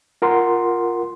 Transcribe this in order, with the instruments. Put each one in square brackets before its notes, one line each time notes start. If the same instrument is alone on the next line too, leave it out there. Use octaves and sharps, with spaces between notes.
[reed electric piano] F4 A#4 F#5 C6